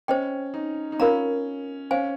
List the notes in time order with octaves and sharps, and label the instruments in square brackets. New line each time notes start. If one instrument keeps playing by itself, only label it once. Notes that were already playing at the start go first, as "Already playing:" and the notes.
[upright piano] C#4 [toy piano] C5 D#5 G5
[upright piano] D#4
D#4
[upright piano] C#4 [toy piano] F4 A#4 F5 A#5
[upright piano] C#4 [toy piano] C5 F5 G#5